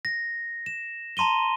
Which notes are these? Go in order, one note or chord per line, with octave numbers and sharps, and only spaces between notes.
A#6
E7
A5 A#5 C6 D#7 G7